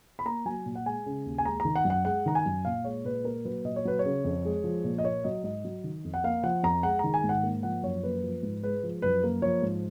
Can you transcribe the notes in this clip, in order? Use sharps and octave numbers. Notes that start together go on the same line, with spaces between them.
B5
A#3 A#5
F#3 G#5
A#2
F#5
G#3 G#5
C#3
D#2
G#5
G#3 A#5
D#3 A#5
F#5
F#2
F#5
G#3 F#5
D#3 A#5
G#5
F#2
A#2 F5
G#3 C#5
A#2 B4
A#3 A#4
F#3 B4
A#2 D#5
C#5
F#3 B4
C#5
C#3
F2
G#3
F3
A#2
D#5
A#3 C#5
F#3 D#5
G#2 D#5
F#3
D#3
F2
F#5
A#3 F5
F3 F#5
F2 A#5
G#3 F#5
D#3 A#5
G#5
G#2
F#5
A#3
F3 F#5
F#2 C#5
A#3 B4
F3
G#2
G#3 B4
F3
F#2 B4
A#3
F3 C#5
G#2